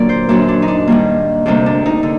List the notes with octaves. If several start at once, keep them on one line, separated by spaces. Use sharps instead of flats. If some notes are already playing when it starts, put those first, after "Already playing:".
Already playing: A#2 D3 F#3 A#3 A#4 D5
C5
F#2 F#3 A#3 D4
D4
D#4
D4
G2 D#3 G3 A#3
D2 C3 G3 A#3 D4
D4
D#4
D3